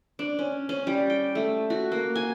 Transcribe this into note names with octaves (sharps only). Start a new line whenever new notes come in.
D4
C#4
C#4
G3
G5
A3
F#4
A#3
G#5